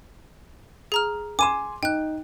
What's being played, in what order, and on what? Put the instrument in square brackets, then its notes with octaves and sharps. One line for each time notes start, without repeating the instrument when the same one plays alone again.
[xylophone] G#4 A#5 F6
[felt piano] G#5 C6 [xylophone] D6 D#7 E7
[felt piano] D#4 [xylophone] G5 F#6